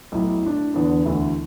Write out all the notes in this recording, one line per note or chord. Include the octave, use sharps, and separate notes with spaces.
B1 A2 A3 E4
A2 A3 D4
E2 D3 B3 D4
E1 D2 D3 A3 E4